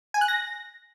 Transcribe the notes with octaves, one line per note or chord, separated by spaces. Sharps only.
G#5
F#6
A#6